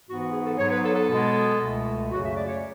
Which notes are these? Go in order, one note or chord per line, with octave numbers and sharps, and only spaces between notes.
G#2 E3 B3 F#4
F#4
G#4
A4
G#2 F#3 B3 C#5
B4
A4
A4
B2 G#3 B3
C#2 B2 A3
F#2 C#3 F#3 A3 F#4
E5
D5
C#5